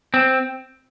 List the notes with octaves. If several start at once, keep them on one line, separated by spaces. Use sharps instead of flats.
C4